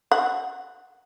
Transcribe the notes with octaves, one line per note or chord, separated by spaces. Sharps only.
F#5